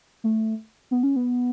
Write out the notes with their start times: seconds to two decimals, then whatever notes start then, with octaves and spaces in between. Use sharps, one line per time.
0.24 A3
0.91 B3
1.03 C#4
1.16 B3